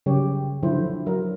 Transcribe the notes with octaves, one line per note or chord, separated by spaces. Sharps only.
C#3 F#3 G3 G4 C#5
D3 F3 F#3 E4 C5
F#3 A#4